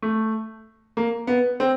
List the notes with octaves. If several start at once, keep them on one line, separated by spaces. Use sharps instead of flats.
A3
A#3
B3
C4